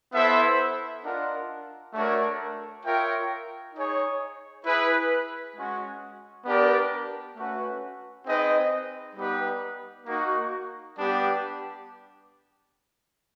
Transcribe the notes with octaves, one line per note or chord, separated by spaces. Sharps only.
B3 E4 A4 C5 E5
D4 F4 A#4 D#5 F#5
A3 D4 F#4 A#4 C#5
F4 A#4 C#5 E5 G5
D#4 G#4 C#5
E4 G#4 B4
G#3 C#4 F#4
B3 D4 G4 A#4 D5
A3 C#4 F#4 B4
C4 D#4 G#4 B4 D#5
G3 B3 D#4 G4 B4
A#3 D#4 F#4
G3 B3 D4 G4